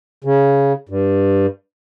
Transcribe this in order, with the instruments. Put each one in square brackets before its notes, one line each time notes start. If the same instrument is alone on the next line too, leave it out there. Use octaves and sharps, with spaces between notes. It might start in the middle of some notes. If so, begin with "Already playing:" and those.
[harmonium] C#3
G2